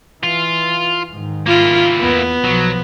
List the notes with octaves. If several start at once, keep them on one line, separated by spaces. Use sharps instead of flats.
E3 F4
G#2 D#3
A#3 E4 F4
E2 B3
B1 F3 F#3